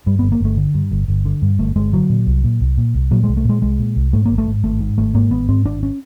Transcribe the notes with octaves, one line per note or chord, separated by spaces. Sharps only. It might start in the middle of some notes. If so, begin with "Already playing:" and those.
G2 G3
G1 B3
A#3
G1 A3
D3
G2
G1
G1
D3
G2
G1 A3
G1 G#3
D3 F#3
A#2
C2
A#2
C2
A#2
C2
A#2 F#3
C2 G#3
A3
A#2 G#3
C2 G#3
A#2
C2
G#2 A3
G#1 A#3
A3
G#2
G#1 A3
G#2
G#1 A3
G#2 A#3
G#1 B3
G#2 C4
G#1 D4
C#4